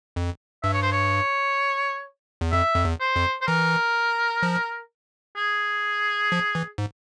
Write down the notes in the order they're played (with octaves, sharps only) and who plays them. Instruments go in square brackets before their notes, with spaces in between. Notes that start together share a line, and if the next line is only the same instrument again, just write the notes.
[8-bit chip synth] F2
[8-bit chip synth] G2 [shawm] E5
[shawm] C#5
C5
C#5
[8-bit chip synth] E2
[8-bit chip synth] F2 [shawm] E5
[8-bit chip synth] F2
E2
[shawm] C5
[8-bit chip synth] F2
[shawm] C5
[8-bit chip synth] E3 [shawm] A#4
[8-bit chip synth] F3
[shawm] G#4
[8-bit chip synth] F3
E3
G#2